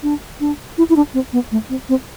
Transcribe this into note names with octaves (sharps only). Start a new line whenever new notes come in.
D4
D4
E4
E4
D4
C4
B3
A3
C4
C4